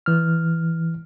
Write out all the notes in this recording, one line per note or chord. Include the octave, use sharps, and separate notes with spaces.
E3 F6